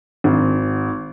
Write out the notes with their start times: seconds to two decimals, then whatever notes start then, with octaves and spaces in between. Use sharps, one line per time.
0.24 G#1